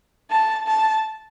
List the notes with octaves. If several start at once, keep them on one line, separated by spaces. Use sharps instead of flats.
A5
A5